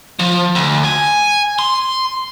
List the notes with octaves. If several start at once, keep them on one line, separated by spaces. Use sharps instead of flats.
F3
D2
G#5
C6